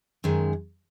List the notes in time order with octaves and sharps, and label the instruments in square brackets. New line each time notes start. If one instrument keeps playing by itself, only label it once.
[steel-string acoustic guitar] F#2 D#3 G#3